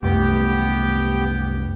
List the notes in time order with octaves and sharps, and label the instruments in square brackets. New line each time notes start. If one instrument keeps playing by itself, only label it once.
[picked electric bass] C2 F#2 A3 [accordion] B3 G4 G5